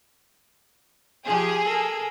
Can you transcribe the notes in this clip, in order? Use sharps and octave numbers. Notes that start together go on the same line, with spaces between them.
F3 G4 G#4
A4 A#4